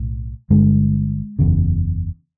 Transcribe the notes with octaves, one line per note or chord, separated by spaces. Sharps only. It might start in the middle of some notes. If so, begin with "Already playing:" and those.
Already playing: B1 A2
G1 G2 D3 G#3
F#1 E2 C#3